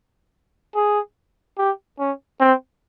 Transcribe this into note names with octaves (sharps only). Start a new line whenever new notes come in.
G#4
G4
C#4
C4